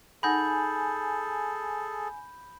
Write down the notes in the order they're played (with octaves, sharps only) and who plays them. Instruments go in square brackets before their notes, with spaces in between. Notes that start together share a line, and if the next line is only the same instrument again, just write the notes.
[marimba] D#4 F#5 A#6 [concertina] G#4 A4 [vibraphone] G#5 [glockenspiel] B5 G6